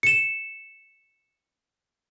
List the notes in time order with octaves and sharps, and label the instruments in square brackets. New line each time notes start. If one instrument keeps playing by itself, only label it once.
[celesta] C#7 E7